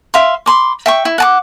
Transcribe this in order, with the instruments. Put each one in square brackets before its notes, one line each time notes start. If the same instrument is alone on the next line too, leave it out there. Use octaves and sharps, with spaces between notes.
[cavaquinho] E5 F5 C6
B5 C6 D6
E5 G5 C#6
E4
F#5 A5 D6